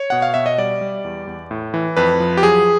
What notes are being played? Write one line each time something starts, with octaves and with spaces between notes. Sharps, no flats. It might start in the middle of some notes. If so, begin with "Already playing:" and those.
Already playing: C#5
B2 F#5
F5
B2 E5
D#5
G3 D5
G3
E2
E2
A2
E3
F2 B4
F3
G4
F#3 G#4